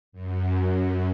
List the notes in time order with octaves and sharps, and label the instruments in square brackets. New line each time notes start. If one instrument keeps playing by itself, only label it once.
[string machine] F#2